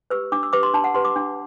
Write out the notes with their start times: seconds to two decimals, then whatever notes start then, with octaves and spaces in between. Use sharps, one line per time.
0.10 G4 B4 E6
0.32 D4 D6
0.43 E6
0.53 G4 B4 D6
0.63 C6
0.74 D4 A5
0.84 F#5
0.94 G4 B4 C6
1.05 D6
1.16 D4